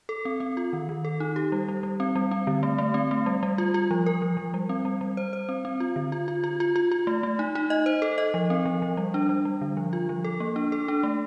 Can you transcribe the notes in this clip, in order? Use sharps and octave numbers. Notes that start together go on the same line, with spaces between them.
A4
C4
C4
F4
D#3
D#3
A4
D#4
G4
G3
G3
G3
C4
G3
C4
D3
A3
A3
C4
A3
G3
G3
F4
F4
F3
A#4
F3
F3
G3
C4
G3
G3
C5
C5
C4
C4
F4
D3
F4
F4
F4
F4
F4
F4
A3
A3
D#4
D#4
D#5
C5
A4
D#5
F3
C4
F3
F3
G3
D4
G3
G3
D3
F3
F4
F3
A4
A#3
D4
A4
D4
A3